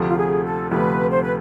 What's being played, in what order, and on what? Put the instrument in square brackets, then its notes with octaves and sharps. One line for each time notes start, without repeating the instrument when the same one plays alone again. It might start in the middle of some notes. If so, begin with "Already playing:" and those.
Already playing: [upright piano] D2 C3 F3 A3
[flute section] F4
G#4
A4
[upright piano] D2 C3 F3 A3 [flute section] B4
[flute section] C5
B4